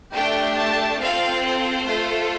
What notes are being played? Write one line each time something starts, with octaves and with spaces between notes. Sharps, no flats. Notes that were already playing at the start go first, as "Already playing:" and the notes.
A3 D4 G4 G5
A5
C4 F4 A4 F5
C5
A3 F4 A4